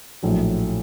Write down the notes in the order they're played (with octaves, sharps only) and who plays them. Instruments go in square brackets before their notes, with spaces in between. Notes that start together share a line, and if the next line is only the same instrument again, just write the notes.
[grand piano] A#1 A2 F#3